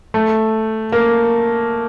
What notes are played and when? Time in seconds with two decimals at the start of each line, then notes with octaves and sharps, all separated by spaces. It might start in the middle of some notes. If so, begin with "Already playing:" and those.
0.14 A3
0.92 A#3